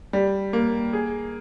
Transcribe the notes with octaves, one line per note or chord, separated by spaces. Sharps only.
G3
A#3
G#4